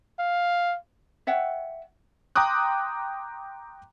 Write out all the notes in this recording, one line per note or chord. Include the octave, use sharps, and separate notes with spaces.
F5
C#5 E5 F#5 G5
G5 A#5 C6 D6 D#6 F#6